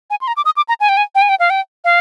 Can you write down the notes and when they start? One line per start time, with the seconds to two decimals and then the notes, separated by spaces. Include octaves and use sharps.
0.10 G#5
0.21 C6
0.28 A#5
0.37 D6
0.45 D#6
0.57 D6
0.69 A#5
0.80 G#5
0.89 G5
0.97 G#5
1.15 G5
1.22 G#5
1.29 G5
1.40 F5
1.50 G5
1.85 F5